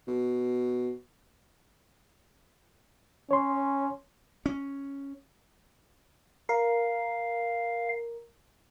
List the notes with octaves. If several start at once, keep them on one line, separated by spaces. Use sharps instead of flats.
B2
C#4 C#5 C6
C#4
A#4 F5